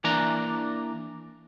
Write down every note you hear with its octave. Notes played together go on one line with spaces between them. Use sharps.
E3 A#3 D4 A#5